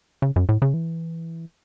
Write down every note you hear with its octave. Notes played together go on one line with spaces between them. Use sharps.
C#3
F#2
A2
C#3
E3